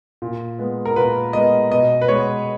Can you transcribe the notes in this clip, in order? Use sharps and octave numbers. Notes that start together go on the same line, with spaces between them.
A#2
G#3 B3
A#4
A#2 B4
G#3 B3 D#5
B2 D#5
B4
G#3 B3 C#5